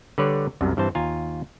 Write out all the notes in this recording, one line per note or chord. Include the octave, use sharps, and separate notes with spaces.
D3 G3 B4 C#5 D5
C2 F#2 C3 D4
G2 E3 C4 C5 A5
D#2 F4 G#5 A#5